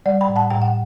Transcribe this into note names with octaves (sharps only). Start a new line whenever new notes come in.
G3 D5 F#5
G5 B5
A2
F#5 A5
A2 G5
F#5